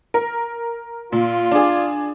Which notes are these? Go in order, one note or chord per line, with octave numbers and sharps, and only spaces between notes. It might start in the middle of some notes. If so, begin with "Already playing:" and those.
A#4
A#2 F4
D4 G#4